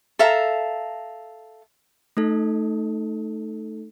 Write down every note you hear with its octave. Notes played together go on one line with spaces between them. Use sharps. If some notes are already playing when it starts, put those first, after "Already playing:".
A4 E5 F5 A#5
A3 D#4 A4